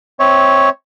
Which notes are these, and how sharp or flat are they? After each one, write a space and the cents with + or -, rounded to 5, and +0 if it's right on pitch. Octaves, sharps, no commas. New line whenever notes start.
C4 +0 C#5 +0 E5 -25